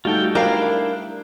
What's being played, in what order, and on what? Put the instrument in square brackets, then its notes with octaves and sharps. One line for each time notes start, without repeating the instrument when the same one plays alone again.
[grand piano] G3 A3 D#4 [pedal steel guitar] F4 G5 [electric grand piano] F#4 A4
[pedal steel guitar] D4 E4 [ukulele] A#4 F5 [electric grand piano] G5